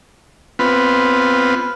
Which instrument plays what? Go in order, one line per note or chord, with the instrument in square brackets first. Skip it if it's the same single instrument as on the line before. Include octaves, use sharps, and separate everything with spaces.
[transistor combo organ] B3 C4 F4 B4